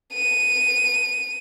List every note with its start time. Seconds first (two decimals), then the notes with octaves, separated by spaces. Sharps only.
0.14 D#7